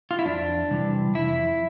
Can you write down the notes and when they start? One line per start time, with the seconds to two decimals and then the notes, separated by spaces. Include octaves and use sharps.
0.11 F4
0.19 E4
0.26 F2 D4
0.71 C3 E3 G3
1.15 F2 E4